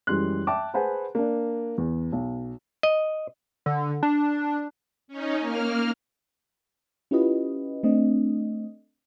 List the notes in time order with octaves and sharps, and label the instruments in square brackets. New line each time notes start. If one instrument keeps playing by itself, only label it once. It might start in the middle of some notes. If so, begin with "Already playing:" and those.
[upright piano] F#2 E3 G3 G#3 C6 F#6
E5 G5 A5 D6
G#4 B4 C5 F#5 G#5 A5
A#3 D4
E2
B1
[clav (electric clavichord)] D#5
[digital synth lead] D3
D4
[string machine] C#4 D#4
A#3 F6
[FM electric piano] C#4 E4 F4 G4 B4 D#5
A3 C4 D4 D#5